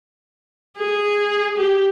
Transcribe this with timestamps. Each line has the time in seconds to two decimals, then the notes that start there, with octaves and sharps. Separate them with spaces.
0.77 G#4
1.57 G4